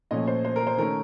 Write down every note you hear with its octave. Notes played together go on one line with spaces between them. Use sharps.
A#2 F3 A3 C#4 D#5
C5
C5
A#4
C5
D#3 A3 C#4 A#4